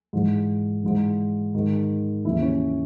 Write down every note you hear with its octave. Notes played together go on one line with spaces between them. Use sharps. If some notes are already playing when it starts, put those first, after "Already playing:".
G#2 E3
G#2 E3
G#2 D#3
D#2 C#3 E3 E4
C#4